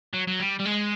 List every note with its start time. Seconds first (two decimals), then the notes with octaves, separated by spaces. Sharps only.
0.14 F#3
0.28 F#3
0.40 G3
0.59 G3
0.65 G#3